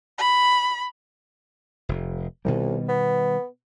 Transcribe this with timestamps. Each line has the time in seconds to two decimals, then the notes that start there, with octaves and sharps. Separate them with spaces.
0.18 B5
1.89 F1
2.45 C2 B2 D#3 G3
2.88 B3